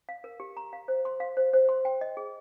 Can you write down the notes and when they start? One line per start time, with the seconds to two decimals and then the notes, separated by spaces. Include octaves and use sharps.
0.09 F5
0.24 A#4
0.40 G4
0.57 A#5
0.73 F5
0.88 C5
1.05 C6
1.20 F5
1.37 C5
1.54 C5
1.69 C6
1.85 G5
2.01 D#5
2.17 G#4